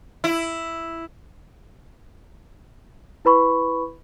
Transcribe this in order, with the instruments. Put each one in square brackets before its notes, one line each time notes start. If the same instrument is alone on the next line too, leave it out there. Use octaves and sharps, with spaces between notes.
[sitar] E4
[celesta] E4 B4 B5 C#6